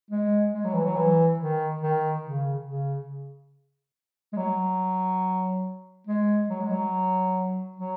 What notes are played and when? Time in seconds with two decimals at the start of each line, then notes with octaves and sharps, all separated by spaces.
0.11 G#3
0.54 G#3
0.64 F#3
0.74 E3
0.85 F#3
0.96 E3
1.39 D#3
1.81 D#3
2.24 C#3
2.66 C#3
4.33 G#3
4.37 F#3
6.07 G#3
6.50 F#3
6.60 G#3
6.71 F#3
7.76 F#3